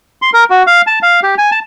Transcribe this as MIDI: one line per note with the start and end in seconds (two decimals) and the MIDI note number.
0.22 0.30 84
0.33 0.44 70
0.50 0.63 66
0.67 0.81 77
0.87 0.99 81
1.03 1.20 77
1.23 1.35 67
1.38 1.50 80
1.52 1.59 81